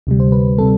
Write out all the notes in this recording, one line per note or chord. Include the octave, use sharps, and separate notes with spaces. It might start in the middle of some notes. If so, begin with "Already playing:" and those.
D2 C3 G3
C5
B4
C3 G3 A4